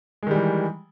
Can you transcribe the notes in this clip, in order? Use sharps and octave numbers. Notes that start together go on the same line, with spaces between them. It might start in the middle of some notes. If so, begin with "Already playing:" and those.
D#3 E3 G3 G#3